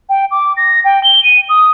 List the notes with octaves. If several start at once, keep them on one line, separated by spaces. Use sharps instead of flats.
G5
D6
A#6
G5
G7
D#7
D#6